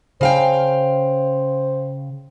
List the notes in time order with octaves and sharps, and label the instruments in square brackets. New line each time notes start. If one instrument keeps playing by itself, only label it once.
[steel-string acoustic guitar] C#3 F5 G5 [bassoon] C5